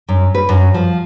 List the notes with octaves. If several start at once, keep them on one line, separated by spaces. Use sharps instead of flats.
F#2
B4
F#2
F3